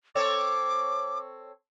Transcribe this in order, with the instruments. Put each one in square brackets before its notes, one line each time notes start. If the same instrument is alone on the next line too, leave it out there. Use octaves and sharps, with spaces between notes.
[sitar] C4 A4 C#5 [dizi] D6